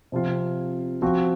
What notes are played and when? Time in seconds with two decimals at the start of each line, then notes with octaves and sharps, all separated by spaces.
0.12 C3 F3 C4 F4
1.02 F3 C4 F#4